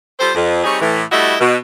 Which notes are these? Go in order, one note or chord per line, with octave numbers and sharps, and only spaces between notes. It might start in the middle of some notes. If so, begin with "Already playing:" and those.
G3 F4 A4 C5
F2
G3 C4 D#4 G#4 C#5
A2 E3
G3 A3 E4 F#4 D#5 E5
B2